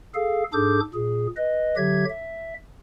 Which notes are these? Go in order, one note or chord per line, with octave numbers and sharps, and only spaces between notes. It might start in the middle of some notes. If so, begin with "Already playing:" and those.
G#4 A4 F5
G#2 D4 G#4 A4 D6 G6
A#2 G#4
B4 D#5
D3 F#3 G4 E5 G#6
E5